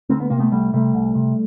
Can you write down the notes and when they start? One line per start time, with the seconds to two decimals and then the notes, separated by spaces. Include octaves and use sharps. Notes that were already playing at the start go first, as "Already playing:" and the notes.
0.09 D2 C4
0.20 B3
0.30 C3 A#3
0.39 A3 B3
0.51 C2 G3 A3
0.73 C3 G3 A3
0.94 C2
1.15 C3